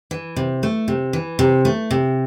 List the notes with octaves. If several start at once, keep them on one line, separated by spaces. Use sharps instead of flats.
E3
C3
A3
C3
E3
C3
A3
C3